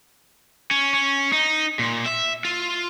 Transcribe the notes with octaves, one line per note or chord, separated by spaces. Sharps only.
C#4
C#4
D#4
A#2
E5
F4